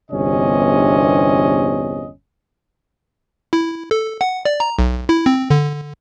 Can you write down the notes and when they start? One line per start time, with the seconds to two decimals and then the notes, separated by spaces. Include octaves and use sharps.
0.11 G1 E2 C3 C#4 D4 D#5
3.53 E4
3.91 A4
4.21 F#5
4.45 D5
4.60 A#5
4.79 B1
5.09 E4
5.26 C4
5.50 D3